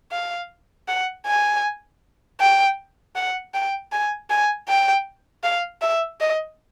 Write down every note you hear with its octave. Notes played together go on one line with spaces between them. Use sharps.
F5
F#5
G#5
G5
F#5
G5
G#5
G#5
G5
F5
E5
D#5